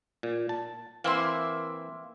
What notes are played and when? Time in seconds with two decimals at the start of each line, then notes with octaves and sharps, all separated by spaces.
0.23 A#2
0.49 A5
1.04 E3 A#3 C4 E4 E5 C6